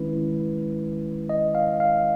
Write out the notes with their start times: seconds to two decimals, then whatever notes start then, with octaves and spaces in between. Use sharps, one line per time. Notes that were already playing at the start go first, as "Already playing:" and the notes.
Already playing: D#3 G#3 C#4 E4 B4
1.29 D#5
1.55 F5
1.80 F5